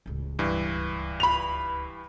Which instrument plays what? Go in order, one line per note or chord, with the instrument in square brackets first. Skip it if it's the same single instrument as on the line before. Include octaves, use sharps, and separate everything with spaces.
[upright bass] D1 C#2
[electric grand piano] G2 E3
[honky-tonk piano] B5 F7